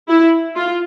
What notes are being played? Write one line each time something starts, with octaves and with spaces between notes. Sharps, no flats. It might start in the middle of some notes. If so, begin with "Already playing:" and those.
E4
F4